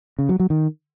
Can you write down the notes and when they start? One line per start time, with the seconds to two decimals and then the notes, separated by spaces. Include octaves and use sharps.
0.19 C#3
0.29 F#3
0.40 F#3
0.50 D#3